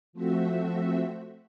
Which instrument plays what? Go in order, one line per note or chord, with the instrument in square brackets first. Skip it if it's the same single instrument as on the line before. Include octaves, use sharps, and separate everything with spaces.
[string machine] F3 A3 C4 F#4 E5